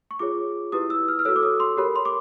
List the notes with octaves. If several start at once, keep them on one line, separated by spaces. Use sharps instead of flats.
C#6
F4 G#4 C#5 D6
E4 G4 B4 D#6
E6
F6
F6
F#4 A4 C#5 E6
D6
D#6
C6
G4 A#4 C#5 B5
C6
D6